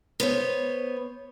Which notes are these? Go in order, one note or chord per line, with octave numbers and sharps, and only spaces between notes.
B3 C5 C#5